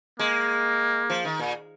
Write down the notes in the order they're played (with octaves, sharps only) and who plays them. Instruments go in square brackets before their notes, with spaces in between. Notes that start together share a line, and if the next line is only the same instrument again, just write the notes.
[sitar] G#3 [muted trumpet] A#3
[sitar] F3
D#3
A#2